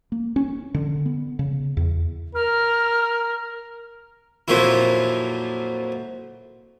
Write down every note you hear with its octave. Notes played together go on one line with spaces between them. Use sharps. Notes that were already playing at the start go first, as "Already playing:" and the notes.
A#3
C#4
D3
B3
C#3
E2
A#4 F6
F2 A#2 F3 F#3 E4